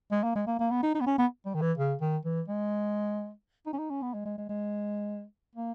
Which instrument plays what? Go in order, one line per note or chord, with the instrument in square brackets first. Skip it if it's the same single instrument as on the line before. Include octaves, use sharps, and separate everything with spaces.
[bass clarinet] G#3
A#3
G#3
A#3
A#3
B3
D#4
D#4
B3
C#4
B3
G3
D#3
E3
C#3
D#3
E3
G#3
D#4
C#4
D#4
C#4
B3
G#3
G#3
G#3
G#3
A#3